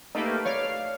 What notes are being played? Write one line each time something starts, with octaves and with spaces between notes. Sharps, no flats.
A3 A#3 D#4 G4 B4
C#5 D5 F5